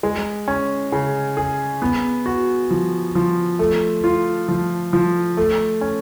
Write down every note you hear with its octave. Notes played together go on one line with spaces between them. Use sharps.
G#3
C#4
C#3
G#4
B3
F#4
F3
F3
A3
F4
F3
F3
A3
C#4